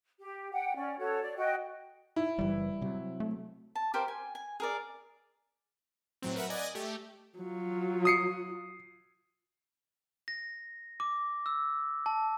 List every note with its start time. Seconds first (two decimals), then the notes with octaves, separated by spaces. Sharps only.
0.20 G4
0.52 F#5 G5
0.75 C#4 D5
0.99 F#4 A4 C#5
1.21 D5
1.37 F#4 D#5 G5
2.16 E4
2.39 F#1 E3 G3
2.81 C3 F#3
3.20 A3
3.75 A5
3.94 G4 A#4 C5 F5
4.08 G#5
4.35 G#5
4.60 G#4 A#4 D5
6.22 A2 F#3 C4
6.36 A#4 B4 E5 F#5
6.50 D5 D#5 G#5 F#6 G#6 A#6
6.75 A3 G4
7.38 F#3 F4
8.05 D#6 C7 C#7
10.28 A#6
11.00 D6
11.46 E6
12.06 A5